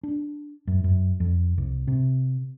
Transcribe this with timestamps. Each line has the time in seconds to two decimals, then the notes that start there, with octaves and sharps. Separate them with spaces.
0.03 D4
0.67 F#2
0.84 F#2
1.20 F2
1.58 C2
1.87 C3